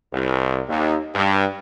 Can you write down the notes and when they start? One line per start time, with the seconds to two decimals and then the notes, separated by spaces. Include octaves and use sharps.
0.12 C2
0.68 D#2
1.14 G2